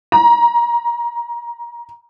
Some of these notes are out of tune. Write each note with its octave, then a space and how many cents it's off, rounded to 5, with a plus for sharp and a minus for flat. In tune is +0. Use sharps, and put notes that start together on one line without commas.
A#5 +30